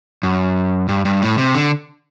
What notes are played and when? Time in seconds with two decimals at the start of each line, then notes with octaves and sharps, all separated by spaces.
0.23 F#2
0.89 G2
1.05 G2
1.22 A2
1.38 C3
1.55 D3